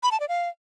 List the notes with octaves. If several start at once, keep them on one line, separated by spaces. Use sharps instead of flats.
B5
A5
D5
F5